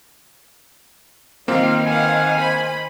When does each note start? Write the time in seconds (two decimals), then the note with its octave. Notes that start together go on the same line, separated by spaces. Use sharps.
1.48 D#3 A#3 C4 F4 A#4 F5
1.86 B4 F5 F#5 G#5
2.36 C5 B5